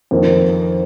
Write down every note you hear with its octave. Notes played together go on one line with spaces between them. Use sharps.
F2 D#3 A#3 D#4